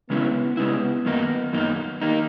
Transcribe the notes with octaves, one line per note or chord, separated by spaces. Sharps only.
C#3 G#3 B3 C#4 E4
C#3 G#3 B3 C#4 E4
F#2 D#3 A#3 D#4
F#2 D#3 A#3 D#4
D#3 A#3 D#4